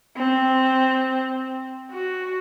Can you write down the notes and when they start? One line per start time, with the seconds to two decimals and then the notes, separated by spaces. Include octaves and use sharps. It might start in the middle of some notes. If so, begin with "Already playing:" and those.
0.17 C4
1.91 F#4